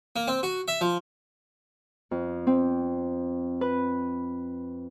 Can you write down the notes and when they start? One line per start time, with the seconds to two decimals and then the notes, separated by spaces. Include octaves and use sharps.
0.16 A#3
0.28 C4
0.43 F#4
0.68 E5
0.81 F3
2.11 F2
2.47 C4
3.61 B4